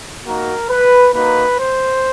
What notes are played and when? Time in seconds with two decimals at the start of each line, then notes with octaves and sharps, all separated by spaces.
0.25 A#3 D#4 F#4 A#4
0.69 B4
1.13 A#3 D#4 F#4 B4
1.58 C5